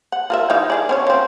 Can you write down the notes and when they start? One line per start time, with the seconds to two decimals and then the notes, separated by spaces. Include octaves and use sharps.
0.12 F#5
0.30 F4 A#4 E5
0.50 E3 D#4 F5
0.70 E4 G#4 D5
0.89 C4 C#4 C#5
1.07 F3 C4